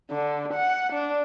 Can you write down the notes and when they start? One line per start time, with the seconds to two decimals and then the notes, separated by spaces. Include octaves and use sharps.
0.11 D3
0.54 F#5
0.93 D4